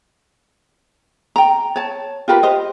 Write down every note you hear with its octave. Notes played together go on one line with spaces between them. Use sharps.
G5 A#5
C#5 A5
F4 G4 A#4 B4
G4 C5 D#5